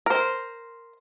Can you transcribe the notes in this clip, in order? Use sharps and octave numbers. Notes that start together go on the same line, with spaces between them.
A#4 C5